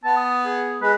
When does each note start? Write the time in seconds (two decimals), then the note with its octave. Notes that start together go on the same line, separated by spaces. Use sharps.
0.04 B3 A5
0.17 D#6
0.45 G#4
0.82 G#3 B4